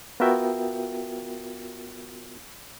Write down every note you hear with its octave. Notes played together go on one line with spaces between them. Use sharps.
B3 F4 F#4 A#4 E5 G5